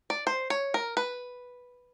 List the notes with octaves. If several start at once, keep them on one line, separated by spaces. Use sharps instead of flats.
D5
C5
C#5
A#4
B4